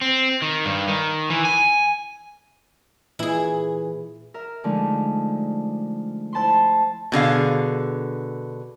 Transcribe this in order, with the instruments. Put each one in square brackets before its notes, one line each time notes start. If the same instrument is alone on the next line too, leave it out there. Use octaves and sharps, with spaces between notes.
[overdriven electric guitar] C4
D#3
G2
D#3
E3
G#5
[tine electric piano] A#2 E3 [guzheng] E4 G#4
[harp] A#4 E5
D3 F3 G#3 A3 D#4
E4 C5 A5 B5 C6
[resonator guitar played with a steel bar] B2 D3 G#4 F5